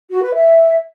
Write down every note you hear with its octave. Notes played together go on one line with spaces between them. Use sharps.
F#4
B4
E5